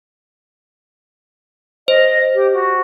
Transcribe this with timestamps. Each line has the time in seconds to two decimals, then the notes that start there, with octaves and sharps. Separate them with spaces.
1.88 C5 D#5
2.35 G4
2.53 F#4